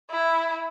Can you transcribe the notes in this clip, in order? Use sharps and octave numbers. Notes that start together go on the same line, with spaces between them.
E4